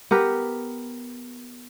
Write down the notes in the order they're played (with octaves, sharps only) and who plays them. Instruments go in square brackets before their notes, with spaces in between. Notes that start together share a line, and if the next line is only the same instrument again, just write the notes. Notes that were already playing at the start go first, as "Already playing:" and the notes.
[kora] B3 G4 A#4 B4